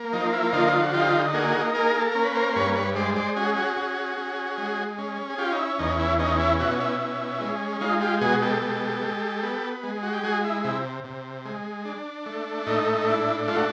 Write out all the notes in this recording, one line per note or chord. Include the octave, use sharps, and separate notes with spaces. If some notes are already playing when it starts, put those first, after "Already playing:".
Already playing: A#3
F3 D#4
E4
D3 D#4 F4
F4
F#4
D#4 F4 G4
A#3 F#4 G#4
A#3 G#4 A#4
A4
C#4 A#4
B4
A#4 C5
C5
G2 B4 C#5
B4 C#5
G#3 C5 D5
C5 D5
C#4 F#4 G#4
F#4 G#4
C#4
C#4
G#3
C#4
G#4
C#4 F4 G4
D#4
E4
E2 D#4
E4
C#4 D#4
E4
B2 E4 F#4
E4
C#4
G#3
G#3 D#4 F4
F4 G4
B2 F#4 G#4
G4 A4
G#3
G#3
B3
G#3
F#4
G4
G#3 F#4 G#4
E4
C3 E4
C3
G#3
D4
A3
A2 D#4
D#4
D4 E4
A3 F4
F#4